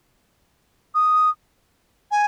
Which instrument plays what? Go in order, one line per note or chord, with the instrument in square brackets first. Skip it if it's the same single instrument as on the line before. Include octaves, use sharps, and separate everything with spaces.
[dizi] D#6
G#5